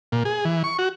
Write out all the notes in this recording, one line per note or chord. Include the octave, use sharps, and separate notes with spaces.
A#2
G#4
E3
C#6
F#4